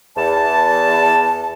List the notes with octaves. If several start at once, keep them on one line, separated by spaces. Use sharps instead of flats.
E2 A5